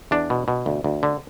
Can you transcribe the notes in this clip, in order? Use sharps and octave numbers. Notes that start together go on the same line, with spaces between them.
E2 D4
B2
B2
D2
D2
D3